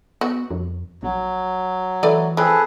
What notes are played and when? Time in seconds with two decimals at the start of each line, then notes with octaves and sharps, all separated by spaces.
0.21 B3 F#4
0.51 F2
1.03 A#1 F#3
2.03 E3 A3 B4 D5
2.37 F3 C4 G#4 A4 B4